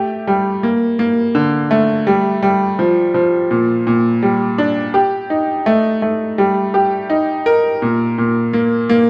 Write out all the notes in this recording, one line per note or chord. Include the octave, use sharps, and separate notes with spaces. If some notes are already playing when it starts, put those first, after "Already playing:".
Already playing: A3 G4
G3
A#3
A#3
D3
A3
G3
G3
F3
F3
A#2
A#2
G3
D4
G4
D#4
A3
A3
G3
G4
D#4
A#4
A#2
A#2
A#3
A#3